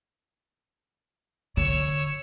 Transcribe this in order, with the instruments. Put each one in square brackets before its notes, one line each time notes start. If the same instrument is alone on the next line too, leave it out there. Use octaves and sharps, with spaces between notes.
[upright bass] D3 [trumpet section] C#5 [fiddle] E6